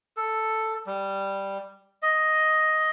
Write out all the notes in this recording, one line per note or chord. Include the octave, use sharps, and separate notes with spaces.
A4
G3
D#5